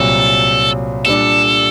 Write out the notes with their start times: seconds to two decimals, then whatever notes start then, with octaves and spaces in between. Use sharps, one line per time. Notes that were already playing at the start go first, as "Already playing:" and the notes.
Already playing: C2 A#2 F#3 A4
1.05 A#2 G3 D4 A4